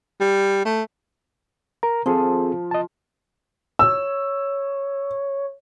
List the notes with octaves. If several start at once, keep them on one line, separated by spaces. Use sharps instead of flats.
G3
A3
A#4 A#5
F3 C4 G#4 A4
D#5 A5
C#5 E6